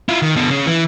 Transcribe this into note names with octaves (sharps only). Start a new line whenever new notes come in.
E4 F4
D#3
B2 D3
C#3
E3